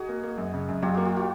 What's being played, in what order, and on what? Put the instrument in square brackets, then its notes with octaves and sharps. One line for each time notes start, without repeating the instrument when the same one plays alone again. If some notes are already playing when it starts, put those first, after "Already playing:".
Already playing: [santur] D#4 F#4 G#4
[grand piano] A#3
A#3
F#2
C#3
F#2
[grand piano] F#3 [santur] F4 G4
[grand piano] A#3 [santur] F#4 G#4
[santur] F4 G4
E4 F#4